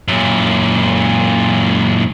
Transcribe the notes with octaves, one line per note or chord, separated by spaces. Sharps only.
F#2 A#2